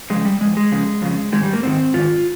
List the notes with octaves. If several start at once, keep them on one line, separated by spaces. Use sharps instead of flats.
F2 C#3 G#3
G3
F2 C#3 G#3
G#3
F2 C#3
F2 C#3
G#2 D#3 G#3
G3
A#3
G#2 D#3 C4
G#2 D#3 F4